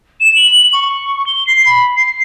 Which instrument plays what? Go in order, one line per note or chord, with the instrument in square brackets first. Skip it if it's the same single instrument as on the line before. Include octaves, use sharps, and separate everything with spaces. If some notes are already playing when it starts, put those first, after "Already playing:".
[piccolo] E7
F#7
C#6
G7
C7
B5
C7